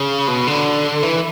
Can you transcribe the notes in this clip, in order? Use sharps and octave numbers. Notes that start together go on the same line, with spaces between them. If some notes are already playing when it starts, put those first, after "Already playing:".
Already playing: C#3
B2
D3
E3